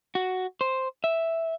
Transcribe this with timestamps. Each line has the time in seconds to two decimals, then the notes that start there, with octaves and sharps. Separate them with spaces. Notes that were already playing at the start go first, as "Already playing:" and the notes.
0.15 F#4
0.61 C5
1.04 E5